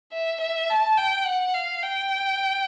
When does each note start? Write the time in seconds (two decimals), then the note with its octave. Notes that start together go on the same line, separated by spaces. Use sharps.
0.13 E5
0.41 E5
0.70 A5
0.98 G5
1.26 F#5
1.54 F5
1.83 G5